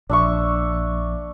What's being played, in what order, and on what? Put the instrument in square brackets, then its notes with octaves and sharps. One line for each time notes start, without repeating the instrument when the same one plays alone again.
[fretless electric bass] A#1 [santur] D4 E5 C#6